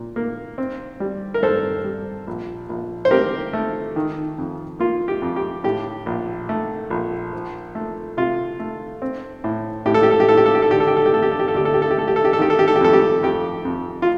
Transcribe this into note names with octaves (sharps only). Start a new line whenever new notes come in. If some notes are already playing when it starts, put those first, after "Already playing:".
Already playing: A#2
A#3
C4
G3
A#4
G2 A4 C5
G3
A#1
A#1
C5
C4 G4 A#4
A3
D#3
F2
A#3 F4
G4
F2
G4
A2 G4
A#1
A3
A#1
F3
A3
C3 F4
A3
C4
A2
A2 G4
A4
G4
A4
G4
A2 A4
G4
A4
G4
A4
D3 G4
A4
G4
A4
G4
A3 A4
G4
A4
G4
A4
D2 G4
A4
G4
A4
G4
A3 A4
G4
A4
G4
A4
D#3 G4
A4
G4
A4
G4
F2 A4
G4
F2 G4
F2
F4